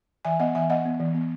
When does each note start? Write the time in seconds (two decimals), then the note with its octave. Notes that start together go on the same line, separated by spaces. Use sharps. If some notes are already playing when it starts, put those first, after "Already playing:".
0.25 E3 E5 G#5
0.39 B3 D#5 F#5
0.55 E3 E5 G#5
0.70 B3 D#5 F#5
0.86 B3
0.99 E3
1.15 B3